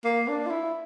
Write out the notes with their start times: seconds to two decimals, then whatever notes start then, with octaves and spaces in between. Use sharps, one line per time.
0.05 A#3
0.28 D4
0.47 F4
0.51 E4